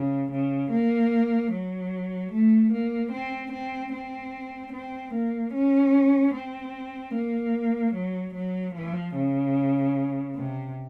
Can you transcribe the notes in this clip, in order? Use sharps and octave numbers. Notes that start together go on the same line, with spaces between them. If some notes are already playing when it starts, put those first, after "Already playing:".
Already playing: C#3
C#3
A#3
F#3
A3
A#3
C4
C4
C4
C4
A#3
C#4
C4
A#3
F#3
F#3
F3
C#3
C3